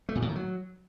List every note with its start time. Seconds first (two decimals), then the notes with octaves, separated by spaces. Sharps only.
0.09 A3
0.15 A#2
0.22 A2
0.29 D#3
0.35 F#3